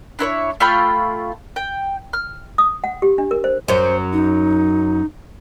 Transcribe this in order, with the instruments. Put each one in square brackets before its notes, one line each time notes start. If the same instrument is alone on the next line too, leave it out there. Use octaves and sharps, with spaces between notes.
[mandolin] D4 E4 C5 C#5
A3 F4 G5 B5
G5
F6
[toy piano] D#6
F#5
G4
D4
A#4
C5
[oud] F#2 F#3 [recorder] C5
[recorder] D#4